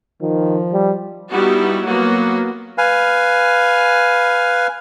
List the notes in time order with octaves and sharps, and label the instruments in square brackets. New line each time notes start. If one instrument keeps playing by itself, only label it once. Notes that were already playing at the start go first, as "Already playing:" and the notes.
[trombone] D#3 [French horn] F3
[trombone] G3
[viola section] G3 B3 D#4 E4 F#4 G4
F#3 A#3 B3 F#4
[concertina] B4 F5 G#5